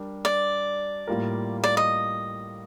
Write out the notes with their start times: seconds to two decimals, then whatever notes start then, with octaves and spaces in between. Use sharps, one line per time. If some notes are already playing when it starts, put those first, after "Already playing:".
Already playing: G3 D4 G4 A#4
0.25 D5
1.07 A2 G3 A#3 F4 A#4
1.64 D5
1.77 D#5